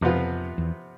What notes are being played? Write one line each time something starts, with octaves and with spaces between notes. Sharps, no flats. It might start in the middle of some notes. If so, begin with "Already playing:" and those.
F2 C3 F3 B3 F4
E2